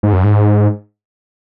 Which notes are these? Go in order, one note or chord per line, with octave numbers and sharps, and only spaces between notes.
G#2
F#2
G#2